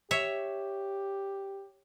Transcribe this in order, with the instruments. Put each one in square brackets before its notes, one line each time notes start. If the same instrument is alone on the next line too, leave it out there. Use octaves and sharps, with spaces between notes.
[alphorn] G4 [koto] C#5 E5